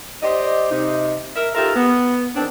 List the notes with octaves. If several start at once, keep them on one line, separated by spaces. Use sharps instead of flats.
G4 C5 D5 D#5
C3 D#4
A#4 E5
D#4 F4 G4 A4 A#4 E5
B3
E2 D#3 C4 D4